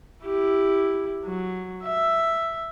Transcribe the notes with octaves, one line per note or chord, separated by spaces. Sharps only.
E4 G4
F#3
E5